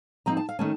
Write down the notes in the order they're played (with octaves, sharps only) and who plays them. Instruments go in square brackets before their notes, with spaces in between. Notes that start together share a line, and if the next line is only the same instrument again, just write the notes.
[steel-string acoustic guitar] F3 C4 D#4 A#5
A5
F5
D#3 A3 C#4 A5